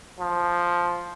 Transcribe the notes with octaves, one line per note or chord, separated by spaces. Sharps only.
F3